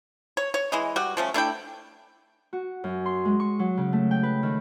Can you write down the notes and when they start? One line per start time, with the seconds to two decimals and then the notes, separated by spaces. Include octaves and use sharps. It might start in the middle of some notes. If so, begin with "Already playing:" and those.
0.37 C#5
0.54 C#5
0.72 E3 G#3 D#5
0.96 G3 F#4
1.17 F3 A3 C#4
1.34 A3 D4 E4 G5
2.53 F#4
2.84 F#2
3.06 C6
3.25 G#3
3.40 C#6
3.59 F#3
3.77 C#3
3.93 A3
4.11 G5
4.23 B4
4.43 D#3